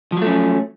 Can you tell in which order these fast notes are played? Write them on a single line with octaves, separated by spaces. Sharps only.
F3 F#3 A3 C#4